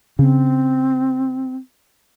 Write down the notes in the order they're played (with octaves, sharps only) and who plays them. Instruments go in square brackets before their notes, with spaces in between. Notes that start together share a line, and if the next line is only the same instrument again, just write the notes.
[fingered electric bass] C#3 [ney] C4